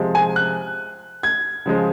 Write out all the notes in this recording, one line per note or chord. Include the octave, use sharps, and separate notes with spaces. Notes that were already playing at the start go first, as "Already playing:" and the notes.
Already playing: C3 F3 G#3
G#5
F#6
G#6
C#3 F3 G#3